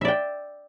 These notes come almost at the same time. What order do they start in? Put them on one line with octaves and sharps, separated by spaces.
E5 D5 G5